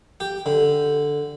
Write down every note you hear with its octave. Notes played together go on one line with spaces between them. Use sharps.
G4
D3